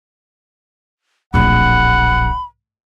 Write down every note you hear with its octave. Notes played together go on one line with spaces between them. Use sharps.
D1 A#1 F#5 B5